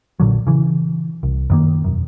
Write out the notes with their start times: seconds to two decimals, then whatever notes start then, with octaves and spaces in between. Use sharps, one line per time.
0.20 A#1 A#2 D3 F#3
0.47 C#3 E3
1.23 C2
1.50 F#2 D#3 A#3
1.84 E1 F#2